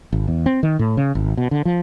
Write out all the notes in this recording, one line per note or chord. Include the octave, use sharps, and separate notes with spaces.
G#1
E2
C4
D#3
A2
C#3
G#1
B2
D3
F3